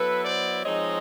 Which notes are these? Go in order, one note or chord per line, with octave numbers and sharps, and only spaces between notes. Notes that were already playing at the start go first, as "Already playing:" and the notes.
Already playing: F#3 B3 E4 A4 B4
C5 D5
F3 G#3 C4 D#4 C#5 D#5